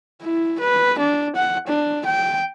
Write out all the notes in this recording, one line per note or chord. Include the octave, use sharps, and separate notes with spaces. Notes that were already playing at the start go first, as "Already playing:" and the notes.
E4
B4
D4
F#5
D4
G5